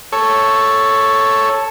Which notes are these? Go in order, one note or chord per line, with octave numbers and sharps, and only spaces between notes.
A4 C#5